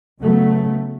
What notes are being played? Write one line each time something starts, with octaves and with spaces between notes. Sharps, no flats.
C#3 F#3 A3 B3